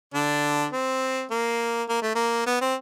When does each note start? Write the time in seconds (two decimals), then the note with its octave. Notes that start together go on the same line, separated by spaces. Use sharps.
0.14 D3 D4
0.72 C4
1.31 A#3
1.89 A#3
2.02 A3
2.15 A#3
2.46 B3
2.61 C4